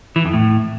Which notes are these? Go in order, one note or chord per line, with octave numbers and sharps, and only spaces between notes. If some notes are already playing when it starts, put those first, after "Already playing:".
E3
F2
A2